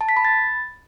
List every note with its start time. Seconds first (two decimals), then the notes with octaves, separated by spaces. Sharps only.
0.01 A5
0.09 B6
0.17 B5
0.25 A6